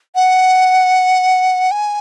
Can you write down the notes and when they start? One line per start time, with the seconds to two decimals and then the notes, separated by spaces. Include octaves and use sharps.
0.15 F#5
1.71 G#5